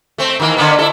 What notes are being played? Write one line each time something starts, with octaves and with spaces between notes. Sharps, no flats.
A3 C4
D#3 E3 A#3
D3 A#3 B3
E4 A4